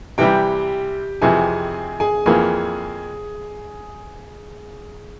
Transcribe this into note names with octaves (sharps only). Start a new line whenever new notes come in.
C3 E3 G3 G4 G5
F2 C3 E3 G#4 G#5
G#4 G#5
F2 E3 A#3 G#4 G#5